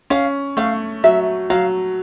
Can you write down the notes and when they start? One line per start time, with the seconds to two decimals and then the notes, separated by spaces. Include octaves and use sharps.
0.10 C#4 F5
0.57 A3 F5
1.04 F#3 E5
1.50 F#3 F5